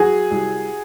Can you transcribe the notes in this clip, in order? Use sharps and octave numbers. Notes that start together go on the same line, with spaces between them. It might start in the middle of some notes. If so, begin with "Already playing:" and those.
Already playing: F#3 F#4 G#4
C2